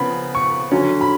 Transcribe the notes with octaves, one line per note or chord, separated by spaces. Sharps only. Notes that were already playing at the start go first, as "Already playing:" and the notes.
Already playing: C#3 F3 B3 B5
C#6
D3 F#3 C#4
B5